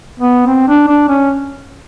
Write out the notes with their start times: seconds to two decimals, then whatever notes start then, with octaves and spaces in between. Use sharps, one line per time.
0.20 B3
0.47 C4
0.68 D4
0.88 D4
1.09 C#4